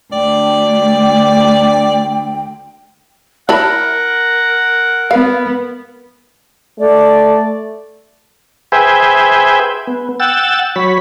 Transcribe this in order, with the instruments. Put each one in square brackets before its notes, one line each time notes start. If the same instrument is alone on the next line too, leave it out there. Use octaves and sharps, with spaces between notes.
[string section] D2 [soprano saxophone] D5 [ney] G5
[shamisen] E4 A5 B5 [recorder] A#4 [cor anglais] F#5
[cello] B3 [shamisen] F5
[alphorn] A3 [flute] D5
[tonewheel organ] G#4 B4 C5 E5 G5 G#5
B3
F#5 G5 E6 A6
F#3 C#5 B5